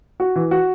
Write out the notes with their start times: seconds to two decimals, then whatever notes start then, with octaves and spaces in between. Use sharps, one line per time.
0.20 F#4
0.36 E3
0.51 F#4